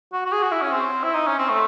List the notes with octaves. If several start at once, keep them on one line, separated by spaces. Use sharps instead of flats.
F#4
F#4
G#4
F#4
E4
C#4
C4
E4
D#4
C#4
C4
A3